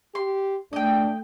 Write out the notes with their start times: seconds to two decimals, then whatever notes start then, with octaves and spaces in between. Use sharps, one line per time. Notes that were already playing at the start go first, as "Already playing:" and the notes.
0.15 G4 C6
0.73 A3 D4 D#5 G5